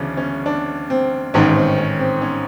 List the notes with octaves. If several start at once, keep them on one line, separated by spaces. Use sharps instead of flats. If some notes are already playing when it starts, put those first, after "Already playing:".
Already playing: D2 C#3 E3 C#4 D4
C#4
D4
C4
A1 G#2 D#3 C#4
C4
C#4
C4
C#4